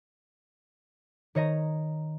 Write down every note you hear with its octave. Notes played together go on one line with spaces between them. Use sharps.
D#3 C#5 D#5 A#5